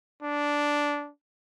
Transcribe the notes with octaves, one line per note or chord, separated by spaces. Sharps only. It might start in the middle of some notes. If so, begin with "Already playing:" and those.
D4